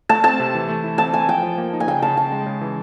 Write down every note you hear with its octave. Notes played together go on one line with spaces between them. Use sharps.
A3 A5
C4 A5
C3
E3
A3
E4
C4 A5
A3 G#5
F3 G5
F3
A#3
D#4
G#5
C#3 G5
C#3 A5
C#3 A5
G#3
C#3
E3